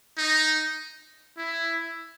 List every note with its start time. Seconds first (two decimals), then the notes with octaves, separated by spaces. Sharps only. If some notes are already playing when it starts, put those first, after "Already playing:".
0.17 D#4
1.37 E4